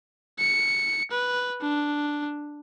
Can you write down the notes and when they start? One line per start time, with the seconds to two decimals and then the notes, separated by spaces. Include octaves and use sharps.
0.39 C#7
1.11 B4
1.61 D4